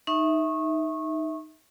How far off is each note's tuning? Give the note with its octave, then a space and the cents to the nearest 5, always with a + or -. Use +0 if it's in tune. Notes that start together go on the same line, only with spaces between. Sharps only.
D#4 +0 E5 -10 C#6 -25